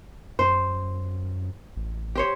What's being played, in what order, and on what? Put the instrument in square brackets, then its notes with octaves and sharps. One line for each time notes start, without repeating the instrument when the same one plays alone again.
[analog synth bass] F#2 [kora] C5
[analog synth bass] A1
[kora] G4 C5 C#5